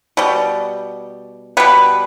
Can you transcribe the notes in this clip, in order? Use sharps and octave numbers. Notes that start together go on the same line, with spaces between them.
B2 G3
B2 G3 B3 B4